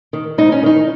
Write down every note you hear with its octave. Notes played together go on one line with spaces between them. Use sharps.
D#3
G#2 D#4
C#4
D#3 D#4